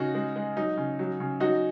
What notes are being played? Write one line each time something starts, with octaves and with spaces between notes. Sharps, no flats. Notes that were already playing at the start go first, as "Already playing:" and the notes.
Already playing: C#3 D#4 F#4
G#3
G#3
F#3 D#4
C#3
F#3
C#3
F#3 D#4 F#4